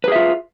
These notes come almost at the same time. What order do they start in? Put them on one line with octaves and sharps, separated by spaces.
B4 G#4 E5 F4